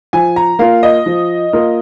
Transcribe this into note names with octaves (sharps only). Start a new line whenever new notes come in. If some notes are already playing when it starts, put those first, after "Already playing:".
F3 G#5
A#5
A#3 F4 F5
D#5
F3
A#3 F4